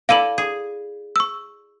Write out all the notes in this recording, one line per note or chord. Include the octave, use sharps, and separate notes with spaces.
E4 A4 D5 F5 D#7 F#7
G#4
C#6 E6